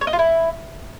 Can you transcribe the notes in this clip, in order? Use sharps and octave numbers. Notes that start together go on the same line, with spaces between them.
C#5
D#5
F4
E4